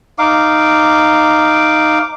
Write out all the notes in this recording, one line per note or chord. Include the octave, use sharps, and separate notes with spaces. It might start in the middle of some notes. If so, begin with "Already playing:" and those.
D#4 F5 D6